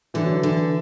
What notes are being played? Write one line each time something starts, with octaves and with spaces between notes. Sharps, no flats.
D3 E3
F#3
E3
D3